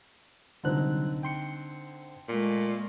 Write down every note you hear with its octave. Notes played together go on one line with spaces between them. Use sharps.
C2 D3 F#3 C4 D#4 F#6
G5 C6 C#7
A#2 G#3 A3